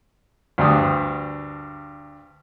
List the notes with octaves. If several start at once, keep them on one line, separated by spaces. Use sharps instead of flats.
D2 G2 D#6